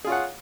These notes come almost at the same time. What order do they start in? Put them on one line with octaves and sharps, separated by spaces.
G#4 F4 C#5 F#5